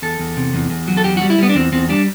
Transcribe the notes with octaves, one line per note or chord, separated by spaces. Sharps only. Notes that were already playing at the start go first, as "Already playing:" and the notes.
E2 A4
E2
C3
E2
E2
F#3
A4
E2 G4
F#4
G3
E4
G3 B3
D4
E2 C4
E2 C4
G3 D4